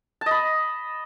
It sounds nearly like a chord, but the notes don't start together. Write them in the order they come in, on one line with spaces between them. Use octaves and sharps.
A5 D#5 B5